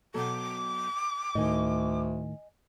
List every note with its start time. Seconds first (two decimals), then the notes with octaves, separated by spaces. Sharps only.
0.14 B2 F#3 A4 D6
1.35 D2 A2 D#3 D#5 G#5